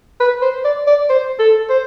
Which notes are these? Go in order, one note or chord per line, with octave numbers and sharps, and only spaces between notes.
B4
C5
D5
D5
C5
A4
C5